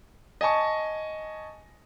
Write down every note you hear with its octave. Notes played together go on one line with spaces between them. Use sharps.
D#5 G#5 A5 C#6